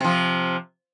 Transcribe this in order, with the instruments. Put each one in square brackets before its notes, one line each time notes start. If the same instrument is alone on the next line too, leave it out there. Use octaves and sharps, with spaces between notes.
[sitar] C3 F3